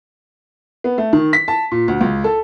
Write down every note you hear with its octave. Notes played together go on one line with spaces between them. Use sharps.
B3
A3
D#3
B6
A5
A#2
D2
C#2
A4